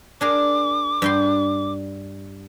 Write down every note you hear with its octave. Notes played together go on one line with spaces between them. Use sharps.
D4 G#4 A#4 D6
G2 G5 C6